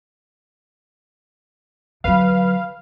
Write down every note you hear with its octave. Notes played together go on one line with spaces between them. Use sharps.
D3 F#3 B4 F5